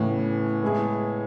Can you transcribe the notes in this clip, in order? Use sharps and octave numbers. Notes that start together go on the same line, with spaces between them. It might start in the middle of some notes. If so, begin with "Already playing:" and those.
Already playing: A2 C#3 E3 B3
G#3 B3 E4 G#4